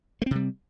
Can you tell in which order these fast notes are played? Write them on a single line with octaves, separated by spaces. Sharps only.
A3 C4 C3 G3